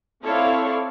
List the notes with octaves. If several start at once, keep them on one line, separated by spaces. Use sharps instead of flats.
C4 E4 A4 C#5 D5 F5